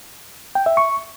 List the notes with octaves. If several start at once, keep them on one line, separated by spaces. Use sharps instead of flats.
G5
E5
C#6